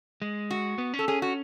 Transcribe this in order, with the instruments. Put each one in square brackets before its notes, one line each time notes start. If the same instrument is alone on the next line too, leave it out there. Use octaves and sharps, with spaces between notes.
[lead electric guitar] G#3
[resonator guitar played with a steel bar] F#4
[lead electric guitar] B3
C#4
[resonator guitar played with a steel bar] A4
[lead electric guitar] C#4 [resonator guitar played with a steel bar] G#4
[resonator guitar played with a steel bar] F#4